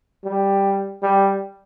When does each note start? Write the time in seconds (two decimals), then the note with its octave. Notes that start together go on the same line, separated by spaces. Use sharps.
0.25 G3
1.02 G3